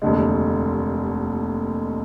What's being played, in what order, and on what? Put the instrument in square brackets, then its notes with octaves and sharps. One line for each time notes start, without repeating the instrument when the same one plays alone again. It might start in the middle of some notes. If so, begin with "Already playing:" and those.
[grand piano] F1 D#2 D3 G#3